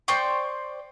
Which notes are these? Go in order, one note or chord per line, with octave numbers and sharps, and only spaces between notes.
C5 D5 G5 C#6